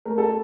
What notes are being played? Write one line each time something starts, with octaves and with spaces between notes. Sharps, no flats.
A3 A#4
A4